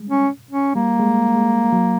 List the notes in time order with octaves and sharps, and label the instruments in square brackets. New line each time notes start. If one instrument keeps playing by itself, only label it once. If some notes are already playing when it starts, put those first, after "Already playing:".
Already playing: [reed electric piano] G3 G#3
[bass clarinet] C#4
C#4
[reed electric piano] G3 [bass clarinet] A#3
[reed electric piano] G#3
G#3
F#3